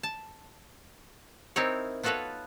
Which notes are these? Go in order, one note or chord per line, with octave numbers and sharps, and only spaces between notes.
A5
C4 D#4 E4 A#4 C#5
B3 F4 F#4 A4 B4 C#5